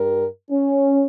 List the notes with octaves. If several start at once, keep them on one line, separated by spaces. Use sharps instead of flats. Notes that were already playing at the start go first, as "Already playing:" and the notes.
Already playing: G2 G3 A#4
C#4